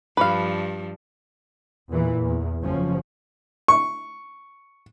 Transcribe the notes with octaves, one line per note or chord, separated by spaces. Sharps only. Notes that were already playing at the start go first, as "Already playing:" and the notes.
G2 F3 B4 F5
E2 A#2 E3
E2
F#1 F3 C#4
C#6